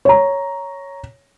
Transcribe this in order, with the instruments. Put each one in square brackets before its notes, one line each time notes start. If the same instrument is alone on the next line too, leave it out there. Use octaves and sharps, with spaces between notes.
[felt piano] C#5 A#5